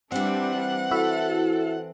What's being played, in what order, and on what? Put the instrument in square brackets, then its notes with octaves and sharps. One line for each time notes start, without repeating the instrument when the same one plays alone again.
[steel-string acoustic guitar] E3 C4 [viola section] G3 D4 [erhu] F#5
[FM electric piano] E4 F#4 E5 [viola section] A4